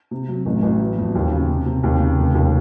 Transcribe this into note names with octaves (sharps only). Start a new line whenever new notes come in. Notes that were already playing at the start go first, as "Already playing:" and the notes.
C3
F#3
A1
A1
F#3
F2
D#2
C#3
C3
C3
D#2
C#3
F1
D#2